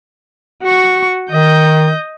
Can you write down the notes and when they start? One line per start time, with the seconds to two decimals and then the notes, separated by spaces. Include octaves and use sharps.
0.63 F#4 C#6
1.31 D#3 D#5 G6